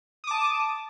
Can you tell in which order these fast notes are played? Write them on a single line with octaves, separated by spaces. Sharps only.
D#6 D6 A5